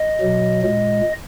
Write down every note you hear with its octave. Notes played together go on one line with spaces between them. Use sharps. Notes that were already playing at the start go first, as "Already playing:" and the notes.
Already playing: D#5
B2 F#3
A#2 G#3